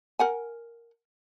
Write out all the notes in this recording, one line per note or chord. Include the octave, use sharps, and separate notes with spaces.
A#4 F#5 G#5